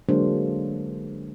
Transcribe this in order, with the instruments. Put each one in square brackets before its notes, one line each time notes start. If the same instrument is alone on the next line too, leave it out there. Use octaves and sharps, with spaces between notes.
[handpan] D3 F#3 G#3 A#3 D4 C5